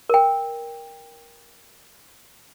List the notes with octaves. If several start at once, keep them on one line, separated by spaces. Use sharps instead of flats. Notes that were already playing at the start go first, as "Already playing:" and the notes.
A#4 G5